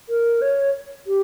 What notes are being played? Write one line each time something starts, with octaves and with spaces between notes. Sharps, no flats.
A#4
C#5
G4